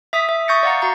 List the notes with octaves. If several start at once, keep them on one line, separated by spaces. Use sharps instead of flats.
E5 D#6 B6
E5
C#6 D#6 G6 A6 A#6 C#7
D5 F5 F#5 A#5
F#4 A#5 G6